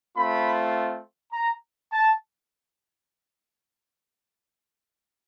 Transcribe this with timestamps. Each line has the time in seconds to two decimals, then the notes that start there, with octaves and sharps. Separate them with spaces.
0.17 A3 C4 F4 B5
1.33 A#5
1.92 A5